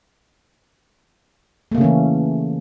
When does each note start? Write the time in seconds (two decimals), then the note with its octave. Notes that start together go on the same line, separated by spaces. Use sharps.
1.72 A3
1.75 A#3
1.78 C#3
1.81 C#4
1.84 E3